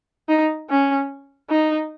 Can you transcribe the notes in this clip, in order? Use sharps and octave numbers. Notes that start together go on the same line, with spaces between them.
D#4
C#4
D#4